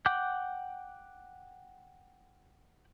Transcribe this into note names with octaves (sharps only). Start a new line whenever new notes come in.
F#5 G5 D6 F#6 G6